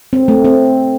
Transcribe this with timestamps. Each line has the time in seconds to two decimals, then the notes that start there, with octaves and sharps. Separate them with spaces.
0.13 C4
0.28 A3
0.45 C4